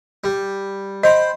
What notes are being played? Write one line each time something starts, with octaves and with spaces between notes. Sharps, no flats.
G3
C5 D#5 G5 B5